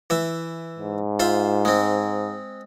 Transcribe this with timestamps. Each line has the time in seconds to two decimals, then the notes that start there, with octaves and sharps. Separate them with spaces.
0.10 E3 E5
0.79 G#2
1.20 F4 C5 E5
1.65 G#3 C4